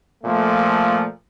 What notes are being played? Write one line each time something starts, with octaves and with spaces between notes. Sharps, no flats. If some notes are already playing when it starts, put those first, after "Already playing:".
A#2 F3 A3